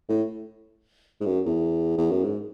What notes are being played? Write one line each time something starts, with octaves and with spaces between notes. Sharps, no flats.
A2
G#2
F#2
E2
E2
F#2
G#2